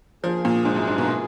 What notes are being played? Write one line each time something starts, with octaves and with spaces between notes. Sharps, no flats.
F3 A#3 F4 G#4
A#2
G#2
F#2
G#2
B2